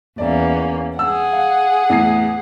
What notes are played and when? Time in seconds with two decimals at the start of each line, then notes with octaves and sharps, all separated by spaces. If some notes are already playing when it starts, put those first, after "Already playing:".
0.18 E2 A#3 C#4 D5 E5
0.99 G#4 F#5 E6
1.33 F5
1.90 E2 A2 C7